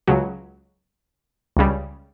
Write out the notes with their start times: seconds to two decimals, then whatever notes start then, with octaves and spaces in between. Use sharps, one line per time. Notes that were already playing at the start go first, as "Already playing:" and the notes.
0.07 C#2 C#3 F#3
1.57 C#2 C#3 G3